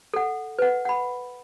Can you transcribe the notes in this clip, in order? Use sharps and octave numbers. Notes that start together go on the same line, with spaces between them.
A4 F#5
B4 F#5
F#5 B5